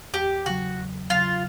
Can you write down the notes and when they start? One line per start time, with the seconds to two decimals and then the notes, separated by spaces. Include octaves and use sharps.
0.13 E2 G4
0.46 C#3 F#3 F#4
0.78 E2
1.10 C#3 F#3 F4